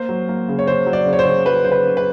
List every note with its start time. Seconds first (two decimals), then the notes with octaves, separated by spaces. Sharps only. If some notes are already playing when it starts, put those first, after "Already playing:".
Already playing: A#3 C5
0.09 F#3
0.29 A#3
0.48 C#3
0.59 C#5
0.67 C#3 C5
0.86 F#3
0.93 D5
1.06 C#3
1.13 C#5
1.19 C5
1.25 C#3
1.46 F#3 B4
1.64 C#3 C5
1.72 B4
1.84 C#3
1.97 B4